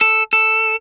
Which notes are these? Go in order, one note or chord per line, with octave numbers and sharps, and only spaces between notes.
A4
A4